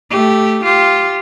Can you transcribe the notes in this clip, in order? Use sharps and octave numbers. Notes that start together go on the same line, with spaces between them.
A3 G4
F4 G4